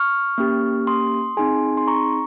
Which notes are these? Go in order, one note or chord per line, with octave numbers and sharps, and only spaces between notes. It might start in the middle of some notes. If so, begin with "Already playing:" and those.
Already playing: C#6 F6
A#3 C#4 G4
C6 D#6
C4 D#4 G#4 G#5 C6
C6
A#5 C#6